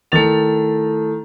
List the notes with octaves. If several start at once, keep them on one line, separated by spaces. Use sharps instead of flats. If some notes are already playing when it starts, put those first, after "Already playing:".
D#3 A3 E4 A4 A6 F7